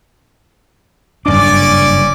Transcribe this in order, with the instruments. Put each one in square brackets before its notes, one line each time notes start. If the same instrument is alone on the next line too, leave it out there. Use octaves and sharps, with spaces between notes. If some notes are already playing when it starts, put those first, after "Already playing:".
[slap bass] F#1 G2 D4 [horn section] C#4 D5 [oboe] D6